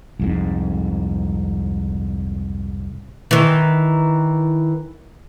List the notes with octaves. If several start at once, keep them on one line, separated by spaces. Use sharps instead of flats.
C2 F2 G#2
D#3 E3